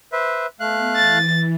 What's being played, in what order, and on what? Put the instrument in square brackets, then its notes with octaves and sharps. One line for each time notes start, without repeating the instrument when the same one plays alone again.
[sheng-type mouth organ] B4 C5 E5
[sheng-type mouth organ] A3 F5 F#6 [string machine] B3
[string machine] E3 [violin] A6